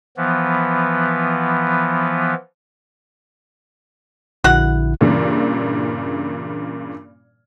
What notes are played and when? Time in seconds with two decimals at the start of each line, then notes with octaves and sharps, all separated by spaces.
0.17 E3 F3 B3
4.44 A#1 D3 E4 F#4 F#5
5.01 G2 A#2 C#3 E3